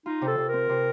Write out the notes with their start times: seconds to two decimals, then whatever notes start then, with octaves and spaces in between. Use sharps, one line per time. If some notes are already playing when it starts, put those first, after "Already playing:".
0.06 D#4 F4
0.22 C3
0.27 A4
0.38 C3
0.48 A#4
0.54 C4
0.69 C3